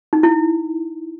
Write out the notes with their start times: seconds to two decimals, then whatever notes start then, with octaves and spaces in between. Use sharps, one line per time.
0.13 D#4
0.23 E4